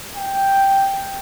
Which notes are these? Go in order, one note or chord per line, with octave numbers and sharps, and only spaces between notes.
G5